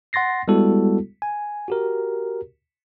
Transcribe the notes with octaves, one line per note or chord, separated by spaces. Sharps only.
F#5 C6 A6 A#6 C7
G3 G#3 B3 E4 F#4 A4
G#5
F#4 G4 A#4